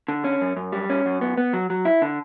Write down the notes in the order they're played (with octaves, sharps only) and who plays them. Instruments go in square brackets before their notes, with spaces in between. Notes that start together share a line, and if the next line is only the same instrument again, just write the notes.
[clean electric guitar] D3
C#4
F#2
F#2
G3
C#4
F#2
B3
B3
F#3
F#3
E4
D3